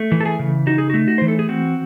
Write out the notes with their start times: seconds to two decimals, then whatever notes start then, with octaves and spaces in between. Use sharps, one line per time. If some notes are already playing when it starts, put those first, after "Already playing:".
Already playing: A3
0.12 E3
0.21 A4
0.25 G#4
0.39 C#3
0.67 D#4 F#4
0.78 G#4
0.90 F#4
0.94 A3
1.08 F#4
1.18 E3 C5
1.28 A4
1.39 G#4
1.49 C4 F#4